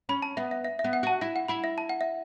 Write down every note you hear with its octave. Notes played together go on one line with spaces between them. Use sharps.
C#4 B5
A5
B3 E5
E5
E5
E5
B3
F#5
F#4 A5
E4 E5
F#5
E4 B5
E5
A5
F#5
E5